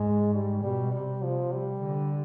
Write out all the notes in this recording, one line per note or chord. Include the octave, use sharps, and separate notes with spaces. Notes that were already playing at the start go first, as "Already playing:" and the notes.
Already playing: G#2 G#3
G3
B2 G3
C3 G3
C3 F3
G3
D3